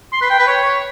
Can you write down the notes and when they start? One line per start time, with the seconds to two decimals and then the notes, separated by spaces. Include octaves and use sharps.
0.13 C6
0.21 B4
0.30 G5
0.39 B4
0.47 C#5